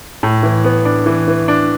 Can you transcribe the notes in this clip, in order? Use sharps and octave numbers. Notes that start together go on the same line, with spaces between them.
A2
E3
B3
D4
E3
E3
D4